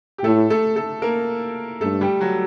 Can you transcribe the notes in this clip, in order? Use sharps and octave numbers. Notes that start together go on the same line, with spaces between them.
G4
A2 A3 A4
A3 A4
A3 A4
A#3 A#4
G2 A3 A4
G3 G4
F#3 F#4